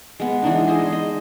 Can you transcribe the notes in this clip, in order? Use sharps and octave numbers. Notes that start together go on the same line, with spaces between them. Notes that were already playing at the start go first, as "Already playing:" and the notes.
G#3 B3
E3 G#3 D4 D#4
G#4 C5 D#5
D#5